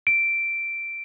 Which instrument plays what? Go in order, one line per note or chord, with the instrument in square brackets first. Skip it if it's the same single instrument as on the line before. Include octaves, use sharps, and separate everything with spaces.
[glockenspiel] D7